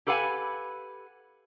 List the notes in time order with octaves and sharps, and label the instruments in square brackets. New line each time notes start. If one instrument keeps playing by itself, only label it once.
[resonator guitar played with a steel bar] G4 A4 B4 F5 F#5 G#5